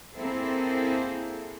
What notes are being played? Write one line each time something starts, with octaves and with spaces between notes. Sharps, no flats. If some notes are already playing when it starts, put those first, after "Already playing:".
A#3 C4 E4 G#4 A4 C5